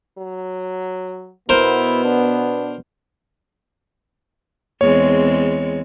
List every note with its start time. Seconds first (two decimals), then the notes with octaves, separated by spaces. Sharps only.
0.18 F#3
1.49 B2 B3 E4 A#4 C5
2.05 D4
4.81 E2 G#3 C4 C#5